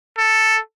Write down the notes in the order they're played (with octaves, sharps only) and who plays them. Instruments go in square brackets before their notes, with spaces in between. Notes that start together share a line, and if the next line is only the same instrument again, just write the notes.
[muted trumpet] A4